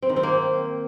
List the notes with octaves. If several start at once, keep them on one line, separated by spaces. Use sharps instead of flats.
C4
D#3
C4
A#3